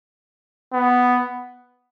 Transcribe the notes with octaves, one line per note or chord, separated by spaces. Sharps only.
B3